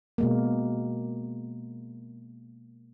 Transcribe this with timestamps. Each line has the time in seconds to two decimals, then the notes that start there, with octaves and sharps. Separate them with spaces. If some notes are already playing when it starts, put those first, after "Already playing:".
0.18 B2 G#3 A#3